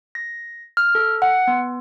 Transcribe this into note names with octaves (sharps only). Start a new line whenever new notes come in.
A#6
F6
A4
F#5
B3